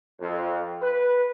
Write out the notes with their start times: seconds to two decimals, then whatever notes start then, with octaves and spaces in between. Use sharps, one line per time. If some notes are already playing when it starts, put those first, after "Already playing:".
0.20 F2
0.81 B4